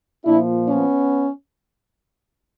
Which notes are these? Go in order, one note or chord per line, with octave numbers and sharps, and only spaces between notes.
A#2 F3 D4 E4
B3 C#4